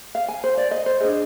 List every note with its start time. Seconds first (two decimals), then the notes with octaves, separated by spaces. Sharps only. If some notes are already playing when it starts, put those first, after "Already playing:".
0.15 F5
0.28 G#5
0.44 C5
0.57 D5
0.71 D#5
0.86 C5
1.00 D4 G#4 D#5